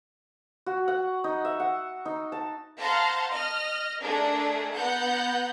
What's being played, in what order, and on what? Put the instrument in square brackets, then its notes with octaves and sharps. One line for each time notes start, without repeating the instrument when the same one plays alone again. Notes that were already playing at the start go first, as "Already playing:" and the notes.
[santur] F#4
F#5
D#4
E5
F#5
D#4
A5
[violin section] C5 F5 F#5 A5 A#5 C6
D#5 F6
A3 D4 D#4 G#4 A#4
B3 F#5 A#5 G6